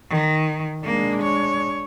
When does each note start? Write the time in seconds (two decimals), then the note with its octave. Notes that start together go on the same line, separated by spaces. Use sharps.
0.10 D#3
0.85 G#3 A#3 D4
1.23 C#5